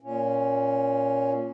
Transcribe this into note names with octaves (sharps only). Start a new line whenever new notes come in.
A#2 C#4